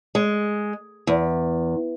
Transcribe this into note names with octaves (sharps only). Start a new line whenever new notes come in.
G#3
E2